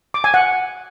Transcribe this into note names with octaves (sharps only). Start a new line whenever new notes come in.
D6
G#5
F#5